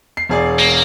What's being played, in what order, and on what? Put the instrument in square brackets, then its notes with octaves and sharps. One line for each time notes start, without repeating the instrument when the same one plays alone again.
[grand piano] C7
E1 G#4 D5
[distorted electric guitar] A#3